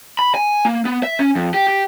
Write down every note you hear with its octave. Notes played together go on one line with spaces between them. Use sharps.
B5
G#5
A#3
B3
E5
C#4
F2
G4
G4